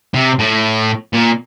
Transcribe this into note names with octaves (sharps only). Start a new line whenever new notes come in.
C3
A2
A#2